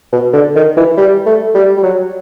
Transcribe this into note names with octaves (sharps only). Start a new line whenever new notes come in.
B2
D3
D#3
E3
G3
A3
G3
G3
F#3